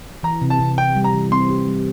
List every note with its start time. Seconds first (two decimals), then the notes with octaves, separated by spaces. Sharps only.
0.23 E3 A#5
0.42 C3
0.50 A5
0.59 C3
0.77 C3 G5
0.96 G3
1.04 A#5
1.13 E3
1.31 C4 C6
1.49 G4
1.67 G3